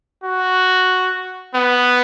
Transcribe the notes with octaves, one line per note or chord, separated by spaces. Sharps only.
F#4
B3